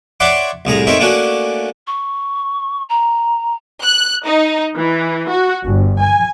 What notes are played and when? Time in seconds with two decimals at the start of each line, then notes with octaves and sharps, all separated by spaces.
0.20 C#5 D5 E5 F#5 C6 D6
0.65 C2 A2 G#4 A#5
0.87 A3 C4 D#4 A#4 C#5 E5
0.99 A3 A#3 C#4 D4 F#4
1.87 C#6
2.89 A#5
3.83 F#6
4.26 D#4
4.76 E3
5.28 F#4
5.66 G1
6.02 G#5